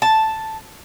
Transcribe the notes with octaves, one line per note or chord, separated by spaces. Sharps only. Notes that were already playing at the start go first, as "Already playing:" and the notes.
A5